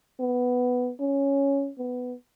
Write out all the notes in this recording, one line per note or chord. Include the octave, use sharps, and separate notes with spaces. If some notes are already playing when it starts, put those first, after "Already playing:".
B3
C#4
B3